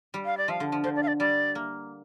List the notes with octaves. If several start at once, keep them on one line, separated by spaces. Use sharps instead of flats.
G3
F5
D5
F3 F5
D3
F3
D3 C5
D5
F5
D5
G3 D5
A#3